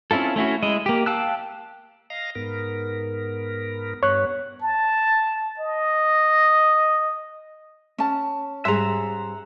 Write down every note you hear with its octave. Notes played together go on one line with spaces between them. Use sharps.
C4 C#4 E4 F4 A4
A3 C#4 E4 F#4
G#3 E4 D#5
A#3 G4
F5 G5 A5 E6 F#6
D#5 F5 A#5
G#2 B3 A#4
G2 B3 C#5 F#6
A5
D#5
C#4 A5
G#2 G3 G#4 E5 F#5 A#5 C6